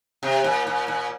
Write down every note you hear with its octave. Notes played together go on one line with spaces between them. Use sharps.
C3
A#2
A#2
A#2